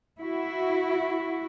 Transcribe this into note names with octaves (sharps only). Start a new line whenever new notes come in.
E4 F#4